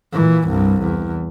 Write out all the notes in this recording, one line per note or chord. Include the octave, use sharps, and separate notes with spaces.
A#2 E3
C2 G2
E2